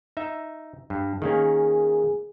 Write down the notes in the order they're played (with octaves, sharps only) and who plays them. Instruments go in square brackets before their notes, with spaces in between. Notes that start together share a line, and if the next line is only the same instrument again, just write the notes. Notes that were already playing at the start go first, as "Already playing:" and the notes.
[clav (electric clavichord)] D#4 E5
G2
[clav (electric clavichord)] D#3 A#3 C#4 [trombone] G#4